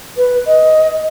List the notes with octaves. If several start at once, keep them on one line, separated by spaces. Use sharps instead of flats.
B4
D#5